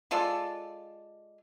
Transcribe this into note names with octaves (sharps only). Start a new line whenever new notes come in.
G#3 F4 A4 D5